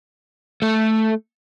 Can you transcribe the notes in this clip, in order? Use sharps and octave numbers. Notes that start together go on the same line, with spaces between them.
A3 A4